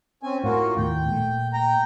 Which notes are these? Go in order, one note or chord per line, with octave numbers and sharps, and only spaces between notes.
C4 C#4 G#5
A2 A#3 F4 F#4
D#2 A2 G5
A#2 A3
G5 A#5